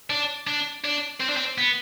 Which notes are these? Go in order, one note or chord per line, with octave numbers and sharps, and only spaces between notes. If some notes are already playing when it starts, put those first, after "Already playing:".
D4
D4
D4
C4
D4
C4
B3